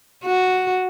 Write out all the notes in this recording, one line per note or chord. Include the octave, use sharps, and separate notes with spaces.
F#4